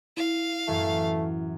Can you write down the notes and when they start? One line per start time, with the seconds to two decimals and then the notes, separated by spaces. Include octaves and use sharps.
0.17 E4 F5
0.67 F#2 A2 E3 A3